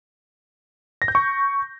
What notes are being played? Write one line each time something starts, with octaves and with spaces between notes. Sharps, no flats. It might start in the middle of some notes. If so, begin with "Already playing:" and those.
A#6
G6
C#6